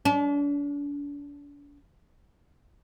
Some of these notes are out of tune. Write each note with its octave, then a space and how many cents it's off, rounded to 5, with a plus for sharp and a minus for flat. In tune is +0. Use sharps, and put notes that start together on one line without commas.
D4 -40